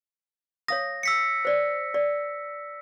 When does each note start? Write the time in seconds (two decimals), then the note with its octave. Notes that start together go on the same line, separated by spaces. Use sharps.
0.68 C#5 F5 D#6 A#6
1.03 E6 B6 C#7
1.45 C5 D5
1.94 D5